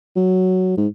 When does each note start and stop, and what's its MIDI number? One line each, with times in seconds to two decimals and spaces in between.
0.16 0.75 54
0.78 0.87 44